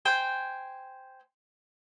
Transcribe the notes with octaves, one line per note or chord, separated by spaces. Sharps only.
C5 G5 G#5